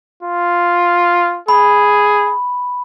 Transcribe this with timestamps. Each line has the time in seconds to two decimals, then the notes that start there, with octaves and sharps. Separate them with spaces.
0.23 F4
1.48 G#4 B5